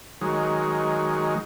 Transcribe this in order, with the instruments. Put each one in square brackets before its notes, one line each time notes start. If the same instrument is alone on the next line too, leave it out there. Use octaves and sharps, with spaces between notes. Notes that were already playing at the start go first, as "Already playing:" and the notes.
[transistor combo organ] D#3 F#3 G#3